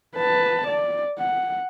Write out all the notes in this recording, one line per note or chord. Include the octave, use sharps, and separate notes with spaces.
B4 A5
D5
F#5